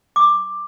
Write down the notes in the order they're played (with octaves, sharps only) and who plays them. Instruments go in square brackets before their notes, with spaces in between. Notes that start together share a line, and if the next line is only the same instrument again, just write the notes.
[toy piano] D6